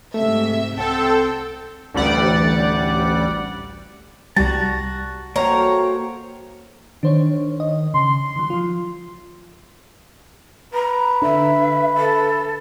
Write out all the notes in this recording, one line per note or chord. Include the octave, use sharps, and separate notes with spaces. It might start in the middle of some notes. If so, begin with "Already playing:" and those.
G#2 C3 A3 E5
C2 C4 A4 F#5 G5
A1 D2 G3 D5 F#5
C2 G3 F#4 A5 A#5
A#3 F#4 G4 A4 C5 C#5 A#5
D#3 D4 C5 C#5
D#5
C#3 C6
D#3 F#3
F3 F4
B4 A#5
D3 E5
A4